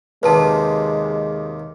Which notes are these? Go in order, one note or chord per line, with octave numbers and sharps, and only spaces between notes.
D#2 C3 D#3 G#3 B4 A5